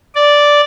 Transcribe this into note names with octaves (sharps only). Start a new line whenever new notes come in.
D5